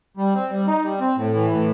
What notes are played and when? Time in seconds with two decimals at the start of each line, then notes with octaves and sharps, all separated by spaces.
0.17 G3
0.34 C4
0.50 G3
0.67 D#4
0.83 G3
1.00 C4
1.17 A2
1.34 E3
1.51 A2